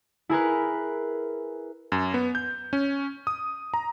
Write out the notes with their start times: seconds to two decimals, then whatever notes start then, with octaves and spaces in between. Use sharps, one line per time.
0.29 E4 G#4 A#4 B4
1.92 F#2
2.14 B3
2.35 G6
2.73 C#4
3.27 D#6
3.74 A#5